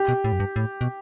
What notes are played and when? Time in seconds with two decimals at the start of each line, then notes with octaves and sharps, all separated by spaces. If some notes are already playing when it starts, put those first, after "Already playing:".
Already playing: G4
0.08 B2
0.24 A2
0.32 F#2
0.40 G2
0.56 A2
0.81 B2